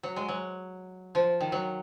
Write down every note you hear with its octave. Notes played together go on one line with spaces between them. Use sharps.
F#3
G#3
F#3
F3
D#3
F#3